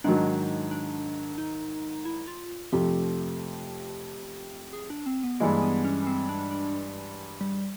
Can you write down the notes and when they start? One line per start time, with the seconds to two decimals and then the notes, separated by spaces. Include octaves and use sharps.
0.04 G#2 D#3 F#3 D4
0.71 D4
1.38 D#4
2.05 E4
2.28 F4
2.72 F2 C3 F3 A3 G4
4.73 G#4
4.90 D4
5.06 C4
5.23 B3
5.40 G2 E3 G#3 A#3
5.62 B3
5.85 C#4
6.07 C4
6.29 D4
6.51 D4
7.41 G3